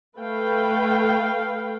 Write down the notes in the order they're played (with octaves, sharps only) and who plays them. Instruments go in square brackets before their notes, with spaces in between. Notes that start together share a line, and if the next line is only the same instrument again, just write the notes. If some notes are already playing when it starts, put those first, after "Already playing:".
[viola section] A3 A4 B4 F5 G5